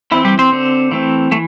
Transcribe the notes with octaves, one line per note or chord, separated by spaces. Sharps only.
E3 C4 E4
G3 G4
C4 C5
D3 C4
E3 A3 C4
E3 A3